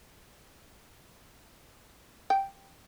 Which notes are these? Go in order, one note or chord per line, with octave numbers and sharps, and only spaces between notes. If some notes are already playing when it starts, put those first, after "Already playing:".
G5